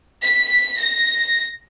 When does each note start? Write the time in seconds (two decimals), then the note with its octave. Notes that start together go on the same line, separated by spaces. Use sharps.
0.25 B6
0.79 A#6